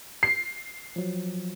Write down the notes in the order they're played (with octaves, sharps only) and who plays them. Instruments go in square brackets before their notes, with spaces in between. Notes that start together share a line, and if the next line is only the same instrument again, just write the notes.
[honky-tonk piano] C7
[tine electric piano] F3 F#3